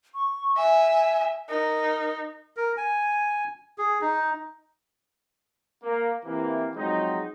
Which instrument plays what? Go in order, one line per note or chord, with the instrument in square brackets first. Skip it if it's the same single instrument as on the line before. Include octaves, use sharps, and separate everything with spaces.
[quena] C#6
[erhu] E5 [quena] G#5
[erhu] D#4 [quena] A#4
[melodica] A#4
G#5
G#4
D#4
[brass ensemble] A#3
C3 E3 A#3
F3 F#3 G#3 C4 D#4